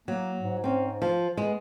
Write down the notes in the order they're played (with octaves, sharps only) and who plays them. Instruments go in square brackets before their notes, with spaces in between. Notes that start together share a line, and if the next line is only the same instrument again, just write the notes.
[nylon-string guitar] F#3 [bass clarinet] A#3
[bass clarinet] G#2
[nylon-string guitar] C4 C#4
F3
G#3 B3